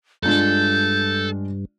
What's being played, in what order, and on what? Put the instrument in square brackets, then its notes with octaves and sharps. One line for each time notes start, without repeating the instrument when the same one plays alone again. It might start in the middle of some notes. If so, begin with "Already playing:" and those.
[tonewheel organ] G2 [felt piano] G#3 D4 F4 [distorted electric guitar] A4 [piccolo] G6